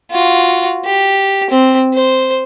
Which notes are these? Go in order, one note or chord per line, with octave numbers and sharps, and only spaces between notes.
F4 F#4
G4
C4
C5